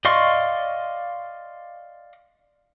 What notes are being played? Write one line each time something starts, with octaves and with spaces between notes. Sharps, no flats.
D5 D#5 F5 C6 C#6